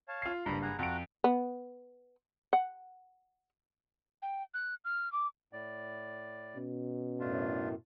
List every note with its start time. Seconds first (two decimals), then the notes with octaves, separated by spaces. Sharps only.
0.08 C#5 F5 A5
0.22 F4 C7
0.46 F#1 G2 A#5 B5
0.62 G#4 F#5 A#5
0.79 F2 F#4 F#5 A#5 D7
1.24 B3
2.53 F#5
4.22 G5
4.54 F#6
4.85 F6
5.13 D6
5.53 A2 D5
6.56 B2 C#4
7.20 F#2 A2 A3 D4 F4